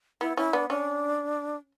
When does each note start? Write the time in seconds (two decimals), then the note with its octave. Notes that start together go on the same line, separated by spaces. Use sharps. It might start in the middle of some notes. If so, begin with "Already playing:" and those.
0.21 B3 E4
0.37 C#4 E4
0.53 B3 D4
0.70 C#4 D4